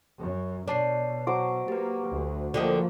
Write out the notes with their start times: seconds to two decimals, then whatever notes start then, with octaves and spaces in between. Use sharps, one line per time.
0.20 F#2
0.68 B2 D4 C#5 A5 C7
1.27 F#3 C5 D6
1.68 A#3 G4 B4
2.09 D2
2.54 D3 F3 A#3 F4 G4 D#5